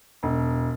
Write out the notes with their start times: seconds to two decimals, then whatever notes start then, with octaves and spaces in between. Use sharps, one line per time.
0.23 E1